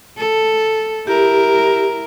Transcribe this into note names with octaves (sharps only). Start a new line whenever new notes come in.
A4
E4 G4 A#4